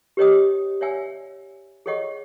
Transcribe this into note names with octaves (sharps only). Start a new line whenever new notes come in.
G4 B4 C#5 D#5 G5 D#6
C#5 D5 E5 F#5 G#5 E6
G#4 A4 C#5 D#5 F#5 C#6